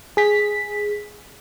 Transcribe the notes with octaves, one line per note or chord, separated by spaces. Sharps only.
G#4 B6